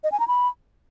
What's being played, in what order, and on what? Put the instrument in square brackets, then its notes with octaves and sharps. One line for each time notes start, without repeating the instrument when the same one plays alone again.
[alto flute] D#5
G#5
A#5
B5